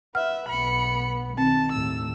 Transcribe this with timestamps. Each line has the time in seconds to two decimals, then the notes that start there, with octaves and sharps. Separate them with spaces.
0.15 B4 E5 F#5 F6
0.49 B1 B3 B5 C#7
1.38 D#3 C4 A5
1.72 D#2 A2 E6